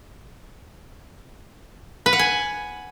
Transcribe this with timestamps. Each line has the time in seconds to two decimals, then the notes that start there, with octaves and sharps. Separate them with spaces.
2.06 B4
2.13 F#5
2.19 G#5